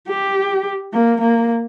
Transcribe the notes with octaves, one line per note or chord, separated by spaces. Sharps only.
G4
A#3
A#3